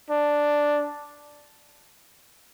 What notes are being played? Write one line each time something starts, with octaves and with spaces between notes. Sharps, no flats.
D4